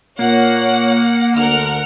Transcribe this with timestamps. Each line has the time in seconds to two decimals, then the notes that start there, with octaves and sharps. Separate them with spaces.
0.19 A#2 A#3 C#5 F#5
1.35 D2 D3 A#4 F#5 F6